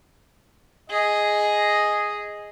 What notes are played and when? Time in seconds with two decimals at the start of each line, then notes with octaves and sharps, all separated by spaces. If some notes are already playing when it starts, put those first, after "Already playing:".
0.90 G#4 D#5